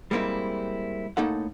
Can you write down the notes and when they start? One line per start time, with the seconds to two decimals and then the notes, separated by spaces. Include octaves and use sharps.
0.11 G3 G#3 A#3 C4 E4
1.17 A2 A#3 D#4 A4 F#5